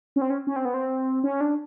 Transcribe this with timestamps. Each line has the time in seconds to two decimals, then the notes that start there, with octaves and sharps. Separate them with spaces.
0.16 C#4
0.22 C4
0.30 C#4
0.47 C#4
0.56 C4
0.65 B3
0.74 C4
1.24 C#4
1.41 D4